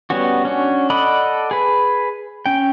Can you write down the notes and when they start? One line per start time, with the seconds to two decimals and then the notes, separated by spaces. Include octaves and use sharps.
0.10 G3 B3 C#4 F#4
0.45 C#4 D4 F#4
0.90 A4 D5 D#5 F#5 B5
1.51 G#4 B4
2.46 C#4 G5